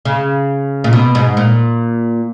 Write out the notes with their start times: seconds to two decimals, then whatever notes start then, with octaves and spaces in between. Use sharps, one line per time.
0.05 C#3
0.84 A#2
0.93 B2
1.15 G#2
1.37 A#2